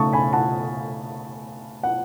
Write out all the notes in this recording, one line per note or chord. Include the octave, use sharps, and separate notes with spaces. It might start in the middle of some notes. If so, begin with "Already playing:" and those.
Already playing: C#3 A3 D#4 A5 C#6 D#6
G#5 B5
F#5 A5
F#5